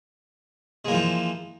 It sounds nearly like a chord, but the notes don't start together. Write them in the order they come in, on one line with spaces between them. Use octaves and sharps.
G#3 A#3 E3 F3